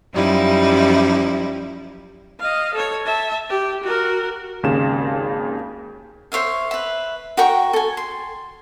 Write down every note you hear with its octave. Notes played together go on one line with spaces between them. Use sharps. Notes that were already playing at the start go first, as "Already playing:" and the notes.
F#2 F3 G3 D#4 E4
D#5 F5
A4 C#5
E5 A5
G4
F#4 A#4
G#1 D#2 C#3 F5 E7
C5 C#5 E5 F5
B4 E5
F#4 A#4 G5 C#6
A4 G#5
C6